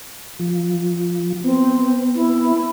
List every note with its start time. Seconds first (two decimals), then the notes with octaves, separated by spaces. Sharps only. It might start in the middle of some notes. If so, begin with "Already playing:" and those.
0.39 F3
1.44 B3 C4
2.15 E4